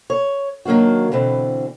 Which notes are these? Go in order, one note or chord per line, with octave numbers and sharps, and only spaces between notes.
C#5
D#3 F#3 A#3 D4 F#4
B2 D3 E3 C4